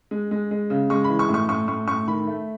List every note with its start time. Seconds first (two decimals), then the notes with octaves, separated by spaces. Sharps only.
0.11 G#3
0.31 G#3
0.51 G#3
0.70 C#3
0.90 G#3 C#6
1.04 E3 B5
1.19 C#6
1.29 A2
1.34 C#6
1.49 A2 C#6
1.68 A2 C#6
1.88 A2 C#6
2.08 D#3 B5
2.27 A3